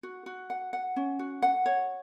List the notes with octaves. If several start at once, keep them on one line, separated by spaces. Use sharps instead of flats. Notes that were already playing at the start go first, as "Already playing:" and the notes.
F#4
F#4
F#5
F#5
C#4
F#4
F#5
C#5